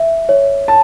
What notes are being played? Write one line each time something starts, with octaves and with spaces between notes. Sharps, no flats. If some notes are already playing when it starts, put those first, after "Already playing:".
Already playing: E5
C#5
A5